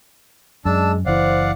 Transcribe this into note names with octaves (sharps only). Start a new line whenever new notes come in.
F#2 G#3 D4 A5 E6
F#1 E3 C5 D5 F5 F#5